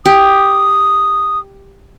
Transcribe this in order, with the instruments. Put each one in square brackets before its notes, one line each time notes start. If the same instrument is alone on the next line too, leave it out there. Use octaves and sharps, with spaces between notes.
[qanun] G4 [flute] D#6